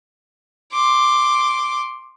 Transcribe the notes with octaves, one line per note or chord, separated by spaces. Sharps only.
C6 D6